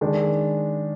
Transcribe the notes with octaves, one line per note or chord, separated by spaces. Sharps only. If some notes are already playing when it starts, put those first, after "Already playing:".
D#3 G#3 D4